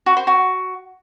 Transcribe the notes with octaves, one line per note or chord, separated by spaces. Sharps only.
F#4
C5
F#4